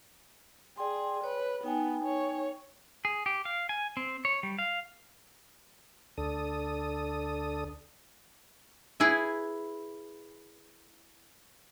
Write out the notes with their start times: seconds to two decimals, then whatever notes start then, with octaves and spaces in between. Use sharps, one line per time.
0.77 G#4 D5 G5 C6
1.24 B4 C#5
1.64 B3 D#4 G5 G#5
2.04 C#5
3.05 G#4
3.26 G4
3.45 F5
3.69 G#5
3.97 C4
4.25 C#5
4.43 G3
4.59 F5
6.18 D2 D4 A4 D#6
9.00 E4 G#4 B4 E5